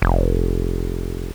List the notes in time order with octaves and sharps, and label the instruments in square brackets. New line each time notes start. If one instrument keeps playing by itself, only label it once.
[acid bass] F1